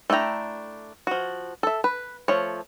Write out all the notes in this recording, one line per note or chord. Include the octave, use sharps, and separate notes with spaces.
A3 D4 E4 G5 A#5
F3 F#4
A4 E5
B4
F3 A3 C#5